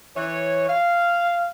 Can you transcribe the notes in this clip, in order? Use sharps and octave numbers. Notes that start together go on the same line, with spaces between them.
E3 C#5
F5